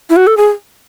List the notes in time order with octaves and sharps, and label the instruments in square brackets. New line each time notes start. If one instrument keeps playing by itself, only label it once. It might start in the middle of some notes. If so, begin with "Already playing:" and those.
[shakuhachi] E4
F#4
A4
G#4